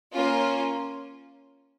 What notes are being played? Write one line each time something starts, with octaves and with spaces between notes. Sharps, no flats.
A#3 C#4 F4